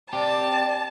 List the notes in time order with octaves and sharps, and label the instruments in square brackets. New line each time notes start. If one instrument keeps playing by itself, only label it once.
[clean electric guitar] C4 G4 [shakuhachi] D5 [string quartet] A5